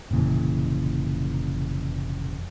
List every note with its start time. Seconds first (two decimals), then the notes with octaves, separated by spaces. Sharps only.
0.11 F1 A#2 C#3 E3